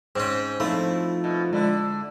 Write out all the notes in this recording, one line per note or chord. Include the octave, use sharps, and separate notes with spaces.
G#2 C4 C#4
F3 A3 C4 D#4 E4 A4 F5
B2
D3 G#3 E4